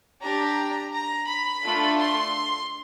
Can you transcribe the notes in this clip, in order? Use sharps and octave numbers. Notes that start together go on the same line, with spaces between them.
D4 G4 A#5
A#5
B5
A3 D4 F4 A4
C6